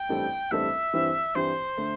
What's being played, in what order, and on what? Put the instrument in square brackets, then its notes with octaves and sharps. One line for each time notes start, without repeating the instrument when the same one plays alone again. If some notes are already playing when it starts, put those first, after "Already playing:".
Already playing: [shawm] G5
[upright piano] A1 G2 G3 C4 A4
[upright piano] A1 G2 G3 C4 A4 [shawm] E5
[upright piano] G2 E3 C4 E4 G4
[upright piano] G2 E3 C4 E4 G4 [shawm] C5
[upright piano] D3 A3